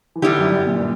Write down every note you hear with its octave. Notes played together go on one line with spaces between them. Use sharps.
E3
D3 G3 B3 E4 G4
F#2
G2
A#2